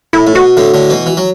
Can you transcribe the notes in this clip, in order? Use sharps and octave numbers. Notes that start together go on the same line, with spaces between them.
A2 E4
A2
B2 F#4
A2 D3
A2 D3
B2 E3
E3
F#3